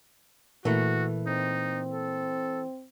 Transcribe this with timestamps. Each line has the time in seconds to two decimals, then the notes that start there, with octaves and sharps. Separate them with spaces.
0.65 A#2 E3 A3 F#4
1.27 C4 D#4
1.93 A4